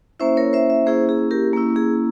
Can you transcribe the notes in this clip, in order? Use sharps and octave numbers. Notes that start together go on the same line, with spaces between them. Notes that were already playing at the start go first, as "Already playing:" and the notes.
A#3 C#4 E4 C5 E5
A#4 C#5
C5 E5
C5 E5
A#3 C#4 E4 G#4 C5
G#4
G4 A#4
A#3 C#4 E4
G#4